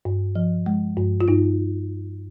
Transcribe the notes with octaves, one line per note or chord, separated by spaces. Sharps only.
G2
F3
G#3
G2
F4
G2 D#4